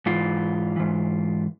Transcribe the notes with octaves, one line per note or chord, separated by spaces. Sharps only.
G#2 E3 F4
G#2 E3